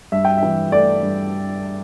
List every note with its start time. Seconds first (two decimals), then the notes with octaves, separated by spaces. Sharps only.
0.12 G2 E5
0.25 G5
0.37 E5
0.43 E3
0.72 A3 D5
1.03 G2